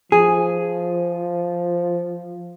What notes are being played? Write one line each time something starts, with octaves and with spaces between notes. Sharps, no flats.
F3 G#4